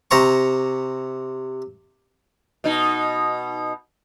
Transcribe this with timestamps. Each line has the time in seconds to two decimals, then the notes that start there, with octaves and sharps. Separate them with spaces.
0.11 C3 C5 A#5 C#6
2.64 B2 D#4